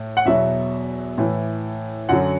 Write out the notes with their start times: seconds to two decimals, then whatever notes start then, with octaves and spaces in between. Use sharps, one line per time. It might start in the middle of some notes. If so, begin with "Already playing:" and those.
Already playing: A2
0.17 F#5
0.25 E2 B2 F#3 E5
1.18 A2 E3
2.09 F#2 D3 F#3 F#5